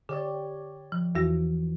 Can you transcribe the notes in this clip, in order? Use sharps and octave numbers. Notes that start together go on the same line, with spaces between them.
D3 G4 C#5 D5
F3
E2 E3 F3 F#4 A#6